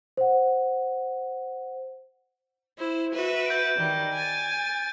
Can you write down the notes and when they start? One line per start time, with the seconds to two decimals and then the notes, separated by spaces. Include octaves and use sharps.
0.17 C5 F#5
2.76 E4 C5
3.12 F#4 B4 E5
3.46 G6 D7
3.76 D#3 G3
4.13 G#5 A6